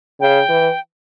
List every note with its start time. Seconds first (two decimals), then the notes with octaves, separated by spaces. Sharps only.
0.20 C#3 G5
0.49 E3